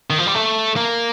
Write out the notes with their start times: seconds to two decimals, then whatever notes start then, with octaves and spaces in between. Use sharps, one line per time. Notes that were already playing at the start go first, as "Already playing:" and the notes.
0.10 D#3
0.18 F3
0.27 G3
0.35 A3
0.76 A#3